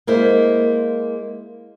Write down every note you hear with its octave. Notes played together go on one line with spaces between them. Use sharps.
G#3 A#3 E4 C5